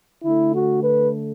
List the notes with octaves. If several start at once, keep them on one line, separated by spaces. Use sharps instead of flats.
D3 A3 E4
F#4
B4